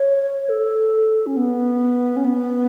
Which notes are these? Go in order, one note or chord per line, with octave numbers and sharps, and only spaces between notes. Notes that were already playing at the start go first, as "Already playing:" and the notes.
Already playing: C#5
A4
C#4
B3
C#4
B3